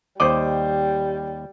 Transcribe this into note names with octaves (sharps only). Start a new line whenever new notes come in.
D#2 G3 C5 D5 D#5 D6